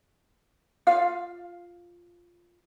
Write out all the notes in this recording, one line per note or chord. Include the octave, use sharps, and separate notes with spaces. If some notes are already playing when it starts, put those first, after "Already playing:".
F4 F5